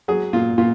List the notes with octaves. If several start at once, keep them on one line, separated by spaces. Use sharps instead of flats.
F#3 G#4
A#2 F4
A#2 F4